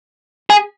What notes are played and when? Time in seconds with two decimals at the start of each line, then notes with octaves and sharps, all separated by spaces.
0.50 G#4